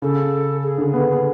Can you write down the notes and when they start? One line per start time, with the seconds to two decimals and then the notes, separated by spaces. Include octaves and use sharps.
0.02 C#3 A4
0.64 G#4
0.78 D3
0.93 B3